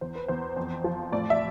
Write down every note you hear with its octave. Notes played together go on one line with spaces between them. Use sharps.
E2 C5
B4
E2 C5
F2
F3
A2 D5
E5